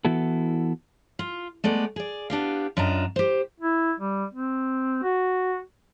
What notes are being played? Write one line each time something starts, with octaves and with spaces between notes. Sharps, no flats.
E3 B3 E4 F#4 A4
F4
G#3 A3 B3 D5
G#4 D5
B3 D4 G4 F5
F#2 D4 F4 D#5 A#5
G4 C5
E4
G3
C4
F#4